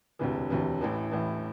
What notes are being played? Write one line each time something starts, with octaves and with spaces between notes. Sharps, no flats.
E1 D2 C3 E3
E1 D2 C3 E3
A1 A2 E3
A1 A2 E3